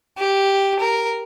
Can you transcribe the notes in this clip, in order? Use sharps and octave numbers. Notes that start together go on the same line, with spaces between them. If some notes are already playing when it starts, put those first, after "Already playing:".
G4
A#4